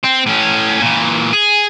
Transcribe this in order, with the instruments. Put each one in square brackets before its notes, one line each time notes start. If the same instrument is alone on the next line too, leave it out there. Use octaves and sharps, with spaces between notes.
[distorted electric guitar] C4
A2 C#4
A#2 E3
G#4